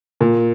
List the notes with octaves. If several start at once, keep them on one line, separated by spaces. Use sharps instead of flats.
A#2